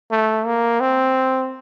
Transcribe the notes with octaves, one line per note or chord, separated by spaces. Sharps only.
A3
A#3
C4